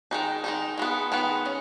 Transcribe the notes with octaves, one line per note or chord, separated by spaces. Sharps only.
D#3 G#3 D#4
D#3 G#3 D#4
D#3 G#3 B3
D#3 G#3 B3
G#3 C#4